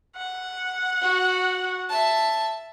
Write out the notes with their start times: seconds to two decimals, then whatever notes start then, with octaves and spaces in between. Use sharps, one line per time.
0.16 F#5
1.02 F#4
1.89 E5 A5